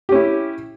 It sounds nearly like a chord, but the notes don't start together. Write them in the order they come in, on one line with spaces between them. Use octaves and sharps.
G4 C#4 E4